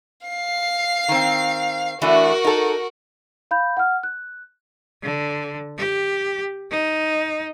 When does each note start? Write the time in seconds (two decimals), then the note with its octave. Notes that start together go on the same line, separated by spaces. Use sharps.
0.27 F5 C7
1.08 D#3 C4
2.02 E3 A3 D4 F#4 A#4
2.44 D#4 A4
3.51 F5 B5 G6
3.77 F#5 F6
4.03 F#6
5.03 D3
5.78 G4
6.71 D#4